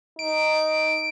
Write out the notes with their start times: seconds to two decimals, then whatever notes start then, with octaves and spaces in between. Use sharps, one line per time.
0.19 D#4 D7